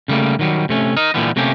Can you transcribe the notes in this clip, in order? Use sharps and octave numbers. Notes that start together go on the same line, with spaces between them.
C#3 G3 A3 A#3
D#3 F#3 G3
C3 A3 C#4
D#4 A#4 D#5
A#2 D3 E3 G3 B3
C3 A3 A#3 C#4 G4